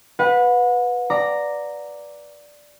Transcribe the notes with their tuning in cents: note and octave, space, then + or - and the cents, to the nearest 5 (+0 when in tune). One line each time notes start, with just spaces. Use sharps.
B4 +0 F#5 -35
D5 +0 A#5 -5 D6 +0